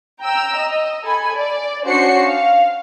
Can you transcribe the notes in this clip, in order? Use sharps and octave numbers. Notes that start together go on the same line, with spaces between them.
G5 A#5 E6
D#5
A4 G#5 B5
D5
C#4 D4 F#4 C5 C7 C#7
F5